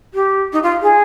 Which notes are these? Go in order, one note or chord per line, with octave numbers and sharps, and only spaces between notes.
G4
D#4
F4
G#4